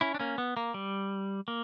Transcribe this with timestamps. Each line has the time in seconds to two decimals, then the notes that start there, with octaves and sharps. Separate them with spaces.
0.01 C#4 E4
0.14 D4
0.20 A#3 C#4
0.38 B3
0.57 A#3
0.74 G3
1.48 A#3